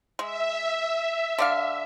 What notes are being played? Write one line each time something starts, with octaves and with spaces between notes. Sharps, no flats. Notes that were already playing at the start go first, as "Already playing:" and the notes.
G#3 E5
D3 D5 F5